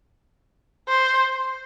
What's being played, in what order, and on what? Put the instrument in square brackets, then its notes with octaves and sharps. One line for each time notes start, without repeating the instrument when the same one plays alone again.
[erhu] C5